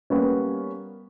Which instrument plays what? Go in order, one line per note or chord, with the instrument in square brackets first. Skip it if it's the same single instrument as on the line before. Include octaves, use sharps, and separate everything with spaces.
[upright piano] G3 A#3 B3 C#4